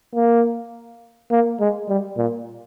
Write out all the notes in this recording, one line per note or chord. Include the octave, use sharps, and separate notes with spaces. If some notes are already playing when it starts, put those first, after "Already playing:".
A#3
A#3
G#3
G3
A#2